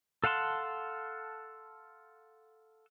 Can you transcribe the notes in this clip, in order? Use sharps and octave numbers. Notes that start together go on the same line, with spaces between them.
A4 F5 F#5 A5 C6